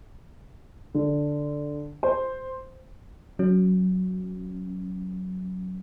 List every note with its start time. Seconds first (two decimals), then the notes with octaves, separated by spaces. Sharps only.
0.94 D3
2.03 C5
3.39 F#3 C#4